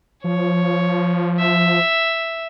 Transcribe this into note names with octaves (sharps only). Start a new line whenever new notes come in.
F3 C#5
E5